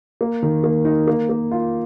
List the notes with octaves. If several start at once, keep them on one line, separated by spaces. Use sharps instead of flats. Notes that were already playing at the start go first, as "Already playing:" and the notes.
A#3
D#3
A#3
D#4
A#3
A#3
F4